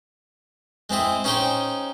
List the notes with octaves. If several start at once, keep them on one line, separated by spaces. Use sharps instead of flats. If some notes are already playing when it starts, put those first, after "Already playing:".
G#3 C4 E4 G#4
C#4 D#4 G#4 C5 G5